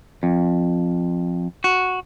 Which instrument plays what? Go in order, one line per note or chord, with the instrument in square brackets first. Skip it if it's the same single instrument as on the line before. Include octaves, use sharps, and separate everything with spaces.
[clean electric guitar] F2
F#4